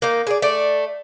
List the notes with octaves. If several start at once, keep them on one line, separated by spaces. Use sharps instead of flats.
A#3 D#4
G#4 D5
A3 D5